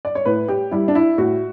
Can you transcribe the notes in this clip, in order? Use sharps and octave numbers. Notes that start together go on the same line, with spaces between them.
D5
C#5
A2 B4
G4
G3 E4
D4
E4
A2 F#4